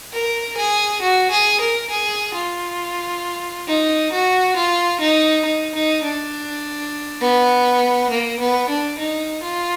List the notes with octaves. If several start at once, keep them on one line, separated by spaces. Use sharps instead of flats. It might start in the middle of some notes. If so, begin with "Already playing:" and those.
A#4
G#4
F#4
G#4
A#4
G#4
F4
D#4
F#4
F4
D#4
D#4
D#4
D4
B3
A#3
B3
D4
D#4
F4